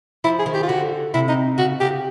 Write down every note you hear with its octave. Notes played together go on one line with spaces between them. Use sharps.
F3 E4
G#4
D#3
G4
F4
D3 F#4
C3 E4
D#4
C#3 F#4
C#3 G4